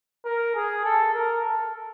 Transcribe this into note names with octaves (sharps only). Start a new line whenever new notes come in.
A#4
G#4
A4
A#4
A4